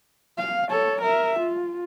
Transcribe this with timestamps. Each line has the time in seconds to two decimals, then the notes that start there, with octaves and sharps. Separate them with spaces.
0.38 F5
0.70 A4 C#5
1.01 A#4 E5
1.39 F4